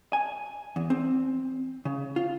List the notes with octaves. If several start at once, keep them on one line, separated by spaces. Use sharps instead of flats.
G#5
E2
C4
C#3
F4